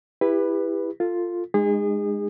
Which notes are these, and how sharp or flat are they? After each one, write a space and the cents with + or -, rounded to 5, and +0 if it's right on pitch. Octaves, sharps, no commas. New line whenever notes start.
E4 +0 G4 +30 B4 +0
F4 +0 A4 +25
G#3 +0 D#4 -35 G#4 -30